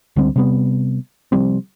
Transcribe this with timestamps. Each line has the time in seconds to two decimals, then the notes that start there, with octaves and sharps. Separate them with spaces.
0.16 C#2 D3 G3 C4
0.36 C3 G3 B3
1.32 C3 F3 G3 C4